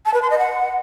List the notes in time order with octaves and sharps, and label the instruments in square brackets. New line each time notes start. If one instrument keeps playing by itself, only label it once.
[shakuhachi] A5
B4
C6
D#5
F#5